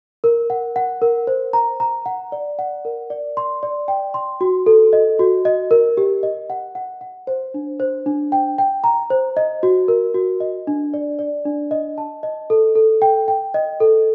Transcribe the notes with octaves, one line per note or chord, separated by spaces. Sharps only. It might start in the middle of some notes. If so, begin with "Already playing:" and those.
A#4
F#5
F#5
A#4
C5
A#5
A#5
F#5
D5
F#5
A#4
D5
C6
D5
G5
C6
F#4
A4
D#5
F#4
D#5
A#4
G4
D#5
F#5
F#5
F#5
C5
D4
C5
D4
G5
G5
A#5
C5
D#5
F#4
A#4
F#4
D#5
D4
D5
D5
D4
D#5
A5
D#5
A4
A4
G5
G5
D#5
A4